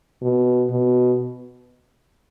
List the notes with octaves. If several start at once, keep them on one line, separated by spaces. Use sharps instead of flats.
B2
B2